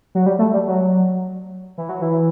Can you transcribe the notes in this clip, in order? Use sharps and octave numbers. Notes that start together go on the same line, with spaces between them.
F#3
G3
A3
G3
F#3
E3
F#3
E3